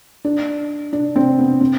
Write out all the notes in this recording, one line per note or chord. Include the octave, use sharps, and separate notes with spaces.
D4
D4
C4
B3
C4